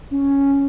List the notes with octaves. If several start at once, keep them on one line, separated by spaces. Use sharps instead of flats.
C#4